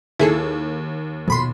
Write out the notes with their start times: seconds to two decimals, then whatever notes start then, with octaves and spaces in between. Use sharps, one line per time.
0.20 D#2 E4 G#4 A4
1.28 F2 B2 B5 C6